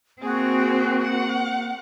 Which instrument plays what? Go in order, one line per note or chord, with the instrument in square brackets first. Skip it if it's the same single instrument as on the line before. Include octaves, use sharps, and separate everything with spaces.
[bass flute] A#3 [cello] C4 [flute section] F#4 [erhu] G#4
[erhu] F#5